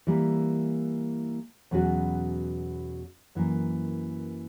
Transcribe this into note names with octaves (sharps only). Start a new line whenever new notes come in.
E3 G3 A#3
E2 B2 F#3 C#4 F#4
F#2 E3 A#3